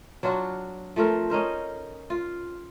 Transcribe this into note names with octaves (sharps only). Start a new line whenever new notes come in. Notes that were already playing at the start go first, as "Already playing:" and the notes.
F#3 D4 F4 F#4
F3 A3 C4 A#4
C#4 D#4 A#4 C5
F4